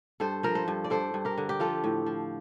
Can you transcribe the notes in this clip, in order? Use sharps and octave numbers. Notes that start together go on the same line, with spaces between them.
G2 A4 C5
F3 A#4
A4 C5
G2
D5
G2 A4 C5
G2
G4 A#4
D3
G4
F3 F4 A4
A2
F3